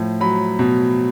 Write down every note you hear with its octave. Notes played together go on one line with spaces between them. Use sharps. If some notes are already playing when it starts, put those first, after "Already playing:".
Already playing: A2 F3
F#3 B5
B2